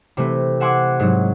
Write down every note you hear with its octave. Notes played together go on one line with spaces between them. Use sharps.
C3 E3 A3
E5 F#5 G#5 C6 D6 E6
G#2 F#3